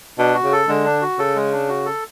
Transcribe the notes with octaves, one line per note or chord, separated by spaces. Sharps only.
B2 D4
F#4
C#3
A4
D3 G#3
D4
F#4
C#3 A4
G#3
D4
F#4
A4